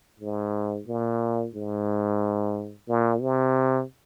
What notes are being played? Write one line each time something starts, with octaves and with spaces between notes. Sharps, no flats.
G#2
A#2
G#2
A#2
C3